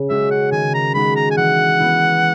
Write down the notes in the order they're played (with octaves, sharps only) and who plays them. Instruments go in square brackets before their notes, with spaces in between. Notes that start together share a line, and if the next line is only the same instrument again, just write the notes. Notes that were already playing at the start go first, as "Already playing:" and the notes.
Already playing: [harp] C#3
[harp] G#3 C#4 F#4 [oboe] E5
[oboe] F#5
[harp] D#3 [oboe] G#5
[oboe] A#5
[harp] G#3 D#4 F#4 [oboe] B5
[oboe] A#5
G#5
[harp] E3 [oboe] F#5
[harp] B3 E4